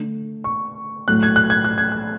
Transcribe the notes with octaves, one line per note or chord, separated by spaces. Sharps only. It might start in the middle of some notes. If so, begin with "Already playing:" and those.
Already playing: D3 A3
C#6
A2 F#3 A3 F#6
G#6
F#6
G#6
F#6
G#6
F#6